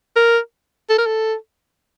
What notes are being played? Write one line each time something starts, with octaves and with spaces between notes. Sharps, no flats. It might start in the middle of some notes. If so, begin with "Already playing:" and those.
A#4
A4
A#4
A4